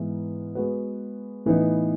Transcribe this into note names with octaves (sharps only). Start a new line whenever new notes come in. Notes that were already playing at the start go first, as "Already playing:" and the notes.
Already playing: G#2 E3 B3
G#3 B3 F#4 B4
A2 E3 B3 D#4